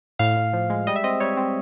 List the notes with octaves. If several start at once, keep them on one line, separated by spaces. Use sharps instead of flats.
A2 F5
A2
F3
G#3
G3 D#5
E5
C4 D#5
G3 C#5
C4